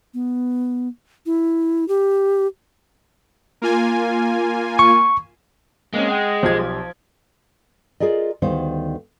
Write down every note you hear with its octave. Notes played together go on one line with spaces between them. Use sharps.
B3
E4
G4
A#3 F4 G#5
C#6
G#3 A#3 C4 C#4
F#5 G5
B1 F3 F4 G4 G#6
F4 G#4 A#4 D5 D#5
D2 D#3 G3 B3 C5 F5